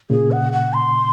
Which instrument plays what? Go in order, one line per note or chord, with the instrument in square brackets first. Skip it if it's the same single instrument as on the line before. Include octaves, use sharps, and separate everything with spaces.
[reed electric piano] A#2 C#3 [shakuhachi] G#4
[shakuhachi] F#5
F#5
C6